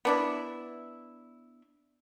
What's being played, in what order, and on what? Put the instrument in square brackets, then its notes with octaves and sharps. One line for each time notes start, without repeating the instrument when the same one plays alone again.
[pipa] B3 D4 E4